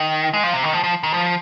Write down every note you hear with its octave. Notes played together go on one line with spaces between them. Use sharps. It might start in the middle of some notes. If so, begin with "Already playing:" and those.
Already playing: D#3
G#3
F3
C3
D#3
F3
F3
D#3
F3